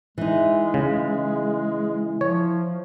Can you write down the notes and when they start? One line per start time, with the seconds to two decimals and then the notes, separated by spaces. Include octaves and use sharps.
0.18 E3 G#3 D#4
0.74 C#3
2.21 F3 C#5